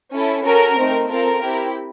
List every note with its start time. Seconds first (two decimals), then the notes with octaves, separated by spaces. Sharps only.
0.13 C#4 E4 A4
0.46 C#4 F#4 A4 A#4
0.78 A3 C4 D#4
1.10 C4 F4 A4 A#4
1.42 C4 E4 G4